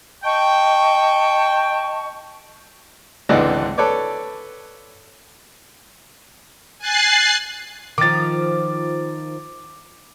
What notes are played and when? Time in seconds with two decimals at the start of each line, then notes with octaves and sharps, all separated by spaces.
0.23 D#5 G5 A5 C#6
3.29 G#1 C#2 D3 E3 D5 D#5
3.78 A4 B4 C#5 D5 D6
6.78 G#5 F#6 A6 C7
7.98 D#3 F3 D6 A6